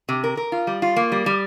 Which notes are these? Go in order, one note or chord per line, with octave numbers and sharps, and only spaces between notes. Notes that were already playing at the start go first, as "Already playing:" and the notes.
C3
A#4
A#4
F4
G3
F4
A#3
G3
G3